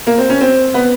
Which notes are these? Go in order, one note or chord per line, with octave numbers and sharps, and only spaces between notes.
A#3
C4
C#4
C4
B3